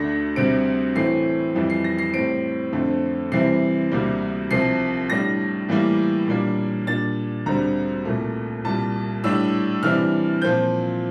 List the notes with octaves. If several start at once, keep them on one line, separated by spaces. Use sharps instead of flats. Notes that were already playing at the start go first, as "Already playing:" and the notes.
Already playing: D2 D3 A3 D4 A#6
D2 C3 G3 C4 D7
A2 E3 A3 C4 C7
F2 E3 G3
C7
A#6
C7
A2 G3 C4 D7
F2 D3 A3 C4
C3 E3 G3 C4 C7
D2 C3 G3 A#3
C2 C3 F3 C7
A2 G3 D4 A#6
A2 E3 G3 A#3
A#2 G3 A#3 D4
A#2 G3 D4 A6
D2 D3 G3 C4 A#5
C2 A#2 A3
C2 A#2 G3 A5
A2 G3 D4 E6
C3 E3 G3 D4 F6
A#2 F3 C4 G6